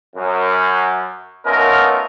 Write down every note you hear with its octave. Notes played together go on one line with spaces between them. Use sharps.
F#2
A3 B3 C#4 D#4 F4 A#4